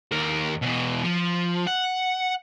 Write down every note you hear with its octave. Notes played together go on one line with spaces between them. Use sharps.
D#2 A#4
B2 E3
F3
F#5